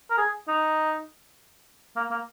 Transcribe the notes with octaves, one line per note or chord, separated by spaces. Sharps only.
A#4
G#4
D#4
A#3
A#3